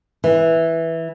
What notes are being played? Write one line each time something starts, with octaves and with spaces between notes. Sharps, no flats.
E3